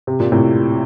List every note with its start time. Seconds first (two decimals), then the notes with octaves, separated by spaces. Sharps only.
0.07 C3
0.20 A#2
0.32 A2 C3